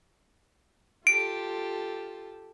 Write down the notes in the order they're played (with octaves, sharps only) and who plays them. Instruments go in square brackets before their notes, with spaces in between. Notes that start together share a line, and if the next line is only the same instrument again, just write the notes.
[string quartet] F4 G4 A4 [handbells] D7